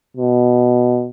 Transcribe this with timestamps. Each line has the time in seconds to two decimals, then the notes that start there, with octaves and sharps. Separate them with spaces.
0.17 B2